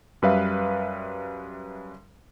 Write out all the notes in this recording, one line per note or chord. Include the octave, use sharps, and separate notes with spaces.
F#2 G3 B4 E5 F5